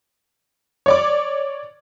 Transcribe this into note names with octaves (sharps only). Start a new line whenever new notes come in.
C#5 D5 D6